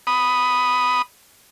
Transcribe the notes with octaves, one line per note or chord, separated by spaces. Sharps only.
B5 D#6